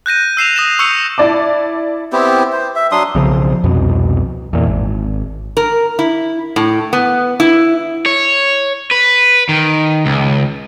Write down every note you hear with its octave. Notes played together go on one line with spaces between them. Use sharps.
F#6 G6 A#6 D#7
E6 C7 E7 F7
D#6 A#6 D#7 E7
C#6 E6 G6 C#7
E4 D5 A5 D6
B3 C4 E4 G4
C5
E5
F#3 D4 C6 D#6
B1 C#3 F3
C2 F2 B2
E2 A#2
G#1
A#4
E4
A2
B3
E4
C#5
B4
D#3
C#2